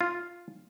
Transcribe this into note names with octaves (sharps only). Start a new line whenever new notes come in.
F4